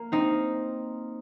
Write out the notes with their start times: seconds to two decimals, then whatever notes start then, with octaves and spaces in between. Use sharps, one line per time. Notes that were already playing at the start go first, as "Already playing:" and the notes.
Already playing: A#3
0.12 C4 D#4